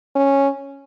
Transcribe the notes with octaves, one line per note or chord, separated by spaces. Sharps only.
C#4